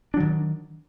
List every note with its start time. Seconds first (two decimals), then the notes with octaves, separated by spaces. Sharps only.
0.14 D4
0.17 F#3
0.20 D#3